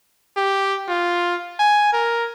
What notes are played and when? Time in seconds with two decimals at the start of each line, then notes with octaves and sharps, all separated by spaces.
0.37 G4
0.89 F4
1.59 G#5
1.93 A#4